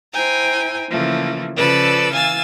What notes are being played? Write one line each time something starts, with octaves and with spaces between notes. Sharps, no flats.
E4 C5 G5 G#5 A#5
C#3 E3 F3 A3 A#3
C#3 F3 A4 B4 D5 E6
E3 F5 G#5 E6 A6